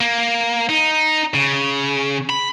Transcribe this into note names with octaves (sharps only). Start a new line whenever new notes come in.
A#3
D#4
C#3
B5